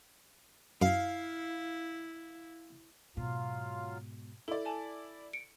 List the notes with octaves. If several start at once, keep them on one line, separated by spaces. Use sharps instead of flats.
F#2 E4 F5
G#2 B2 F#3 F4 F5
E4 A4 D5
A4 G#5 A5
C#7 D7